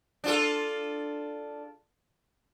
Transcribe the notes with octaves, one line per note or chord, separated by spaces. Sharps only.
D4 F4 A4